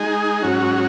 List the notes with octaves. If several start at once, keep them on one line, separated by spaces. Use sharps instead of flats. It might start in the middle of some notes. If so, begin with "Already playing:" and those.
Already playing: G#3 D#4 G#4
G#2 F#3 C#4 F#4